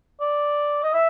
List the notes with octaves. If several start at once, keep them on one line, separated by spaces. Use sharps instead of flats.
D5
D#5
E5